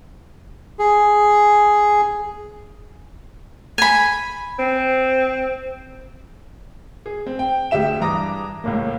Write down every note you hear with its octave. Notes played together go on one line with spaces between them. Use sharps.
G#4
G#5 B5
C4
G#4
C4
G5
D2 G#3 G4 E5 E7
G2 E3 A#5 D6 D#6 A#6
C#2 A2 A#3